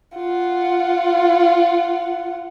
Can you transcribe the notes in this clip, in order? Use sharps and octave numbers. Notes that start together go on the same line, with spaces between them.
F4 F#5